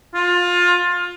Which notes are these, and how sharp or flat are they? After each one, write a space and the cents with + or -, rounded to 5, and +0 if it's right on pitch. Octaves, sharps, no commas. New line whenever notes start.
F4 +20